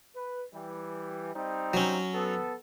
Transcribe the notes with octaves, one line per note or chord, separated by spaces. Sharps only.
B4
E3 G3
G3 C4 D#4
F#3 C#4
B3 A4